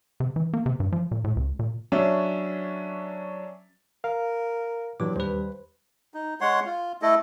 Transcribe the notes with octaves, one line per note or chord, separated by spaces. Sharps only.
C3
E3
A#3
C3
G2
F3
A#2
A2
C#2
A#2
F#3 C#4 D4 E5
A#4 F5
G2 A#2 E3 F#3 D6
D#2 G3 B4 C5
D#4
G#3 C#5 F#5 C6
F4
A3 E4 A4 D#5